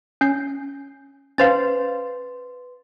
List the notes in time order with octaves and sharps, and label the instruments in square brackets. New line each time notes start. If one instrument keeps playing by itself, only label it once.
[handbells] C#4 G6 C7
[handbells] C#4 C5 F5 [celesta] B4 C6 A6